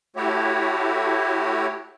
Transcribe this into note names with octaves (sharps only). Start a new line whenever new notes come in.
A3 E4 F#4 G4 C#5